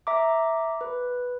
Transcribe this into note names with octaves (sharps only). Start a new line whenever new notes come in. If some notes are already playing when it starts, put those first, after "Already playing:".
E5 A#5 D6
B4